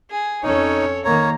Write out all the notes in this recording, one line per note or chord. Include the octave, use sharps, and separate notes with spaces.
G#4
F2 C#4 D#4 A4 C#5
D#3 A#3 C#5 A#5